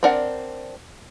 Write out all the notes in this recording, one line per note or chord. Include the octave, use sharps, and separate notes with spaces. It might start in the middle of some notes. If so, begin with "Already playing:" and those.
C4 D4 A#4 D5 F#5